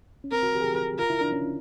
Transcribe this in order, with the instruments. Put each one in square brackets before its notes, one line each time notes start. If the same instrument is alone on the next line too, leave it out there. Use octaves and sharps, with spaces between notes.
[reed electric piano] C#4
[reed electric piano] C4 [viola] A#4
[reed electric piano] F#4
G4
G#4
G4
[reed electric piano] F4 [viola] A#4
[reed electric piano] E4
D4
C#4